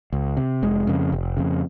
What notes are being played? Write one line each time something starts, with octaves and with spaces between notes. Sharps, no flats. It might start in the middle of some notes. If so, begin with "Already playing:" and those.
C#2
C3
F1 G#3
F2 C#3
F1
F2 C#3